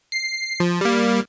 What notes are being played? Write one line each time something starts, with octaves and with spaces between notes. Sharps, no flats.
C7
F3
G3 A#3